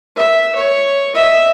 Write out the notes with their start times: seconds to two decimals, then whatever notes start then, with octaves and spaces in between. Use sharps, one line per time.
0.16 E5
0.55 C#5
1.15 D#5 E5